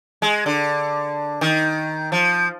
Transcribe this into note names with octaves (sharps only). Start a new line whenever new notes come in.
G#3
D3
D#3
F3